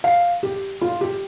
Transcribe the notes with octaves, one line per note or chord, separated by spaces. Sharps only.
F5
G4
F4
G4